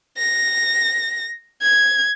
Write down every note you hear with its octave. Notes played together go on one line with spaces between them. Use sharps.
A#6
G#6